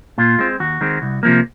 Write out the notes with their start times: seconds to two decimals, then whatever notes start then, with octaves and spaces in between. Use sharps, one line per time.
0.18 A#2 F4
0.39 G#3 C4
0.60 D#2 F#4
0.81 D#3 G#3 C4
1.02 C2
1.23 C3 F3 A#3